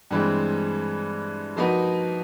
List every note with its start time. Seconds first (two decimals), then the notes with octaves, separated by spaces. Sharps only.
0.11 G2 E3 G#3 C4
1.57 F3 A#3 D#4 F#4 B4